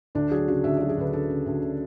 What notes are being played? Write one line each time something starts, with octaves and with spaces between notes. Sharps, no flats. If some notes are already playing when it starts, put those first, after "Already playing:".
D2 D4
F#3 G#4
C#3 F#4
D2 E5
F#3 D5
G#4
D2 B4
D2 A4
C#3
D2
C#3